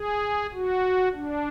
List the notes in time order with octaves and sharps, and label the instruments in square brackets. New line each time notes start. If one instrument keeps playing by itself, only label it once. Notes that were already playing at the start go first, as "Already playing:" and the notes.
Already playing: [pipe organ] G#4
F#4
D4